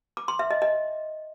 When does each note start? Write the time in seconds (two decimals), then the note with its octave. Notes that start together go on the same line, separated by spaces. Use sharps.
0.17 D6
0.28 C6
0.39 E5
0.51 D#5
0.62 D#5